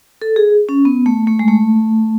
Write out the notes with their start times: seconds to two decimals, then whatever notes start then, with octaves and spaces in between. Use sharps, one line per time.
0.22 A4
0.36 G#4
0.69 C#4
0.85 B3
1.06 A3
1.27 A3
1.39 G#3
1.48 A3